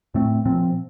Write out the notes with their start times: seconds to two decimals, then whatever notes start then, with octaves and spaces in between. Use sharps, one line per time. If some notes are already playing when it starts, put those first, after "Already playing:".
0.14 A2 A3 C4
0.45 A#2 F3 C4